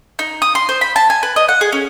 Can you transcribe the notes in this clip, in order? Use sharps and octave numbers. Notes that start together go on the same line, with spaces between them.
D#4
D#6
C6
C5
B5
A5
G#5
B4
D#5
F#5
G#4
C#4